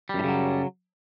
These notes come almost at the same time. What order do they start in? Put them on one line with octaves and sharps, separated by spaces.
G3 F#2 A2 C#3 F#3